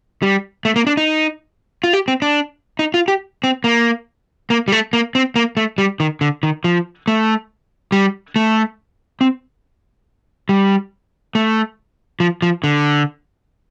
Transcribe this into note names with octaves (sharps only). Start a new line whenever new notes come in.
G3
A3
A#3
D4
D#4
F4
G4
C4
D4
D#4
F4
G4
C4
A#3
A#3
G3
A3
A#3
C4
A#3
A3
G3
D#3
D3
D#3
F3
A3
G3
A3
C4
G3
A3
F3
F3
D3